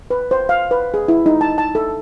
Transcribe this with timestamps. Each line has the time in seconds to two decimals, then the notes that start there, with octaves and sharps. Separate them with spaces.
0.10 B4
0.31 C5
0.49 F5
0.71 B4
0.94 G#4
1.08 E4
1.26 D#4
1.41 A5
1.58 A5
1.75 A4